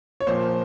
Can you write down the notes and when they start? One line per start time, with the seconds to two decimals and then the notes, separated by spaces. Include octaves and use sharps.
0.20 C#5
0.27 A#2 F3 A#3 C5